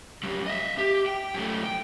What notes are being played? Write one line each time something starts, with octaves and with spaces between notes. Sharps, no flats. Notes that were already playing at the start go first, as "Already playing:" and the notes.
F#2 G3
D#5 E5
G4
G5
F#2 A3
G5